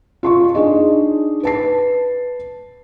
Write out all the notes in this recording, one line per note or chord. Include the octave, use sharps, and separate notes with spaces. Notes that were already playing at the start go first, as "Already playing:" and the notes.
F4 C6 C#6
D4 D#4 G#4 D#5
B4 A5 C7